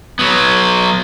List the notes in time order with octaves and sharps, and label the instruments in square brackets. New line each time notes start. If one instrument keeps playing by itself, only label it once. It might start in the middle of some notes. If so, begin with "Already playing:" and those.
[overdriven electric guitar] F#3 B3